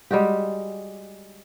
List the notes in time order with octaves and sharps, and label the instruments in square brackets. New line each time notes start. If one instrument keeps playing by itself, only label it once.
[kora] G3 G#3 F#4 G4